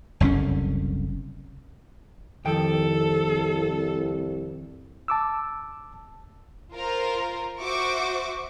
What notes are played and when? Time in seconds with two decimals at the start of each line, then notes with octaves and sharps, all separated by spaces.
0.20 F#1 C2 D3 C#4
2.45 C2 F2 D#3 A4 G5
5.08 A5 D6 E6
6.73 F4 A#4 C5
7.59 F#4 C5 E5 C#6 D6